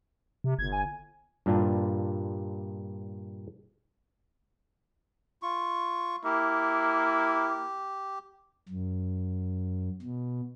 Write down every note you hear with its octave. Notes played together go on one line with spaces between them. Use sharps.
C3
G1 G#6
G#5
G2 A#2 D4 F4
F4 C#6
A#3 E4 G4
F#2
B2